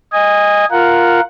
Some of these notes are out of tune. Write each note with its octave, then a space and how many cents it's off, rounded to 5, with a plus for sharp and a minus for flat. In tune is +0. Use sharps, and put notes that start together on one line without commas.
D#5 +0 G#5 -25
F4 +0 A#4 +0 F#5 +0